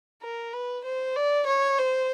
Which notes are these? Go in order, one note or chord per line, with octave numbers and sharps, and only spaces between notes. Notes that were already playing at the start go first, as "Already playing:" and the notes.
A#4
B4
C5
D5
C#5
C5